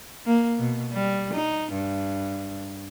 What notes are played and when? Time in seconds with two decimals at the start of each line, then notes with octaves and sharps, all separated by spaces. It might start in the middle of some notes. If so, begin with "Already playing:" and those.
0.26 A#3
0.59 B2
0.92 G3
1.33 D#4
1.73 G2